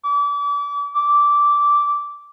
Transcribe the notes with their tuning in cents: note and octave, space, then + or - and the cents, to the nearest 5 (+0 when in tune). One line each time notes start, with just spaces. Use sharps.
D6 -35
D6 -10